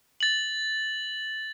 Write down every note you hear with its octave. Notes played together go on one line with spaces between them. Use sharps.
A6 F#7